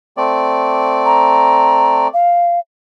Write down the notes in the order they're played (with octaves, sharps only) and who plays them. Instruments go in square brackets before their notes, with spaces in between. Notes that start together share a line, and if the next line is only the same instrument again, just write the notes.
[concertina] A3 C4 D5
[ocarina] A#5
F5